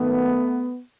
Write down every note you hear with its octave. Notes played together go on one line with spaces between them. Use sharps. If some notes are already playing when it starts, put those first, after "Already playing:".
Already playing: G#1 F#2 D#3 A3 B3